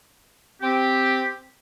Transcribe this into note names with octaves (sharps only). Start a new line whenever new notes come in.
C4 G4